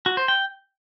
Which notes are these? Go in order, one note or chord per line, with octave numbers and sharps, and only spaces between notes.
F#4
C5
G5